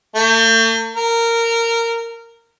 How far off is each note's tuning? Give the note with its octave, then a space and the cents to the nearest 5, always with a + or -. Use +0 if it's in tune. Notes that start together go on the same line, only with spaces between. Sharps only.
A3 +45
A#4 -15